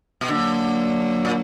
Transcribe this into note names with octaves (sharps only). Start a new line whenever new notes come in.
B2
D3 F#3 A#3
A#2